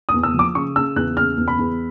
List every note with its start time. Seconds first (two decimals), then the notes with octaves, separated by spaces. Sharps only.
0.09 D#6
0.14 E2
0.23 E6
0.34 F3 D6
0.55 C#3 C#6
0.76 C#3 E6
0.96 E2 F#6
1.17 C#3 F6
1.38 E2
1.48 B5
1.59 E2